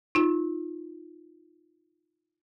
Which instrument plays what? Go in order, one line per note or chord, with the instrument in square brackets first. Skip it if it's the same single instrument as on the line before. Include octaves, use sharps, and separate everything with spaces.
[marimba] D#4 F4